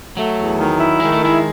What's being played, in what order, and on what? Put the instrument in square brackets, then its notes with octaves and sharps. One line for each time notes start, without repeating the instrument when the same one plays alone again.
[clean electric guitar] F#3 [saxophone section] A3
[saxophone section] E2
D#3
E4
[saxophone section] D#3 [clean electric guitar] G#3
[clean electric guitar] A3
[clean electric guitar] G#3 [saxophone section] E4